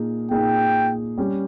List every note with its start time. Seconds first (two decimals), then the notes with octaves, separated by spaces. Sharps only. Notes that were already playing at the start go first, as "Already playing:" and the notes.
Already playing: A#2 A#3 D#4 G#4
0.31 A#2 A#3 D#4 G#4 G5
1.18 G3 C#4 G4